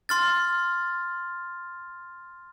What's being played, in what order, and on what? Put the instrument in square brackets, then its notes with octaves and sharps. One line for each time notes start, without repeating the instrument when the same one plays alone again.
[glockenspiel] C6 F6 A6